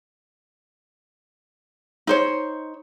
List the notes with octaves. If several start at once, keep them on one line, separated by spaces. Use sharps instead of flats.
D#4 C5 C#5